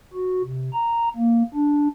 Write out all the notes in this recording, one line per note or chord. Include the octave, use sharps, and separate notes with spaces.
F#4
C3
A#5
A#3
D4